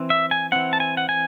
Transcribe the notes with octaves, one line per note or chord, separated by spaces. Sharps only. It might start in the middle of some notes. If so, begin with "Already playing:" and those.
Already playing: E3 C4
E5
G#5
E3 C4 F#5
A5
G#5
F#5
G#5